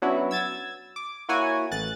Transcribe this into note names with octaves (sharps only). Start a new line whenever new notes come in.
F#3 B3 C#4 D4 E4 F#4
E6 G#6 A6
D6
A#3 E4 F#4 C#5 G#5
A1 F#6 A6